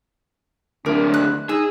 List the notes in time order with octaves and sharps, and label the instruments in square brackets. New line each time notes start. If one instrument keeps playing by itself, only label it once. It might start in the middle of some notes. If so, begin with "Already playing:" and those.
[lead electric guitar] D2 E4 [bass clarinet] D4 [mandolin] A#4
[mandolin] F#6
[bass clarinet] D#4 [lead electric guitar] G#4 [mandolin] E6